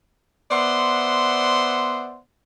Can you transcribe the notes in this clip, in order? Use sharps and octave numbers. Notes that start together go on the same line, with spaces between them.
B3 C5 D5 E5 F#5 C6